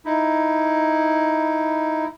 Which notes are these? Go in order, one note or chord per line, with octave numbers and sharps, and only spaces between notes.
D#4 E4